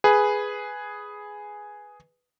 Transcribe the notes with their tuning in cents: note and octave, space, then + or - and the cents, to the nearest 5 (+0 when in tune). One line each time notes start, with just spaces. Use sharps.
G#4 +0 B4 +0